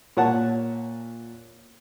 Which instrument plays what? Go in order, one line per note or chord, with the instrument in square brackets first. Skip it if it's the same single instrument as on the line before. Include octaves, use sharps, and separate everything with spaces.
[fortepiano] A#2 C#5 F#5 A5